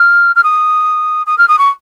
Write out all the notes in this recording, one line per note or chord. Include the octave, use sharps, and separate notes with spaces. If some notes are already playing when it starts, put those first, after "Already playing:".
Already playing: F6
F6
D#6
D#6
F6
D#6
C#6